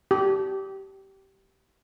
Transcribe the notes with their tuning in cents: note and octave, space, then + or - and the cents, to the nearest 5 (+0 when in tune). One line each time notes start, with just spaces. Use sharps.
G4 -20